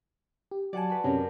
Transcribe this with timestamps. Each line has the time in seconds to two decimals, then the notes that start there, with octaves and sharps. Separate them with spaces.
0.51 G4
0.73 F#3 D5 F#5 G#5 A5
0.90 F#4 B4
1.04 F#2 C3 C#4 A#4